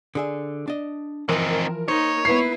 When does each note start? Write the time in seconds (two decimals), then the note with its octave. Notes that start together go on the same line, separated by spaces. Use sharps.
0.15 D3 G#4 E5
0.68 D4 D#5
1.29 E3 F3 C4 D#4 A#4
1.88 A#3 D#4 C5 C#5
2.25 B3 E4 B4 C7